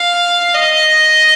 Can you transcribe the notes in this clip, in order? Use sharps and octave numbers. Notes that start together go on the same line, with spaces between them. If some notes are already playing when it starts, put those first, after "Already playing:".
Already playing: F5
D#5